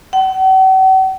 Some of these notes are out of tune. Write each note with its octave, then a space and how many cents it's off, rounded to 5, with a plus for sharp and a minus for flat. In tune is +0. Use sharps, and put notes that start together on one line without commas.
F#5 +45